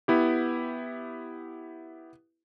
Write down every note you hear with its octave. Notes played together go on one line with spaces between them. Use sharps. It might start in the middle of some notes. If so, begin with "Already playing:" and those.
B3 E4 G4